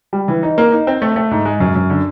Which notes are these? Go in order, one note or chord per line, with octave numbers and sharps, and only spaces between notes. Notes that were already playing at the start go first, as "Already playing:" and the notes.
G3
E3
D#4
A#3
D#4
C4
A3
A3
G#2
G#3
F#2
F#2
D3